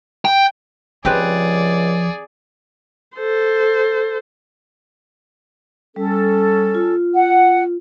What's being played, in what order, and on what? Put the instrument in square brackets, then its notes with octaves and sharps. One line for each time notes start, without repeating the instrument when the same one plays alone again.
[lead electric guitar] G5
[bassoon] C#2 [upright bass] F3 [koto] C4 G4 B4 [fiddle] G#4 D5
[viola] A4 C5
[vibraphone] G3 [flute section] C#4 A4
[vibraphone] F4
[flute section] F#5